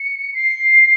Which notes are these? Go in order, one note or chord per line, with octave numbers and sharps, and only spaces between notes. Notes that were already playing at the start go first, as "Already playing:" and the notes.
Already playing: C#7
C7